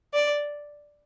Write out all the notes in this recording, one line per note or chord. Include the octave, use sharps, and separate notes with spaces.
D5